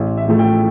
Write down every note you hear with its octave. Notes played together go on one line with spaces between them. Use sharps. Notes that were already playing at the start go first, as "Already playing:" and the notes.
Already playing: A1
E5
A2 F3 A3
G5